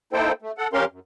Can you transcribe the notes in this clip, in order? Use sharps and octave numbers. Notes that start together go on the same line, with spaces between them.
A#3 D#4 E4 A4 C5 G5
A3
A4 F#5
F2 C#4 G4 A#4 F5 C6
F#2